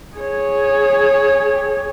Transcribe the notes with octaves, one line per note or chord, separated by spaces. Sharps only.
G#4 C#5